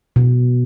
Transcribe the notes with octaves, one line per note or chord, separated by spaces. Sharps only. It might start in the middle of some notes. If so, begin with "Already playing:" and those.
B2